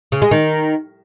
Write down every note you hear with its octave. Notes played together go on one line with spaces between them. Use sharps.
C#3
G#3
D#3